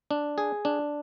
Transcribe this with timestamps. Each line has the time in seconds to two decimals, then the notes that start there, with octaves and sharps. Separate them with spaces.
0.11 D4
0.38 G#4
0.65 D4